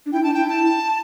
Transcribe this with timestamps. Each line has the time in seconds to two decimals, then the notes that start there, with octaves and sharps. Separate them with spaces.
0.06 D4
0.13 E4 G5
0.24 D4 A5
0.34 E4 G5
0.49 A5